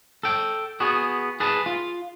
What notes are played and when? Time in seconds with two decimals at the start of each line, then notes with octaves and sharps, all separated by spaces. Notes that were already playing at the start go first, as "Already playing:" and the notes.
0.23 A4 G5
0.80 B3 F#4 G#4
1.40 G#4 B4 A5
1.66 F4